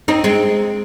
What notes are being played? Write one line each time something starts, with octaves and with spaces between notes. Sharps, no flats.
C4 D#4
G#3 C4